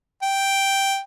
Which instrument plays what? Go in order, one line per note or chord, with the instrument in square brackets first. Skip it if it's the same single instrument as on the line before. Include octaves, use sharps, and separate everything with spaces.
[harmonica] G5